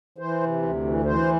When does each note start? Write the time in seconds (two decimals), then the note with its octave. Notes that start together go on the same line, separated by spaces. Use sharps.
0.18 E3 C5
0.41 C3
0.62 D2
0.83 E3
1.05 E3 C5